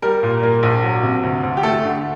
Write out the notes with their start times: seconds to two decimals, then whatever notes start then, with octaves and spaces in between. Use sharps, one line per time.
0.02 G3 A#4
0.23 A#2
0.43 A#3
0.63 A#1
0.83 F#3
1.03 C3
1.23 D2
1.43 D2
1.57 G4
1.63 A3 A4
1.84 D3